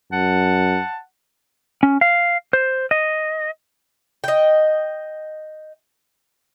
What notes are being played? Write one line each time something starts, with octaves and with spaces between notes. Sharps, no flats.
F#2 F#5 A5
C#4
F5
C5
D#5
D#5 G5